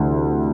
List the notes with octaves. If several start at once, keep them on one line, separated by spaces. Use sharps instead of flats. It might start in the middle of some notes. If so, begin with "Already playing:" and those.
Already playing: D2 C3 E3